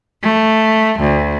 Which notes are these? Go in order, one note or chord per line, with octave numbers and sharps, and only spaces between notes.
A3
D2